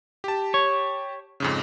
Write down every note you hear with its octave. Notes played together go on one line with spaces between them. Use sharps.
G4 A5
C#5
F2 G#2 C#3